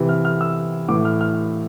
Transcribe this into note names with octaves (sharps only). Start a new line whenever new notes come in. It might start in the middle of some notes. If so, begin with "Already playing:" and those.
Already playing: C3 E3
F6
F6
E6
A2 E3 D6
F6
F6